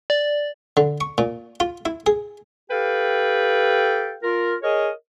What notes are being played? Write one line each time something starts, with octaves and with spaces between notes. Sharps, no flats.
D5
D3
C#6
A#2
F4
E4
G#4
G4 A4 B4 F5 G5
F4 A#4
G#4 A#4 C#5 D#5